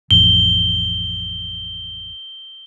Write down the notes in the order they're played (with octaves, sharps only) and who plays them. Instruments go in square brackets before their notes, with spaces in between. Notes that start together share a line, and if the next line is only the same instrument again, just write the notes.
[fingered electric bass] A1 F2 [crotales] G7